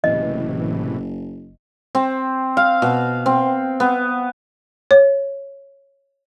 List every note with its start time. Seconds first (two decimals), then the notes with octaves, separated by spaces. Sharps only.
0.04 F#1 A2 C3 E3 D#5
1.95 C4
2.57 F5
2.82 B2
3.26 C4
3.80 B3
4.91 C#5